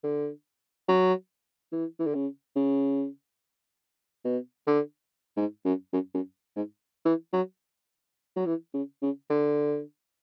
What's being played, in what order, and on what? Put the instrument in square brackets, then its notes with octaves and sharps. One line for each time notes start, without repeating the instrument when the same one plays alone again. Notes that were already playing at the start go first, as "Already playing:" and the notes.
[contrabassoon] D3
F#3
E3
E3
D3
C#3
C#3
B2
D3
G#2
F#2
F#2
F#2
G#2
E3
F#3
F#3
E3
C#3
C#3
D3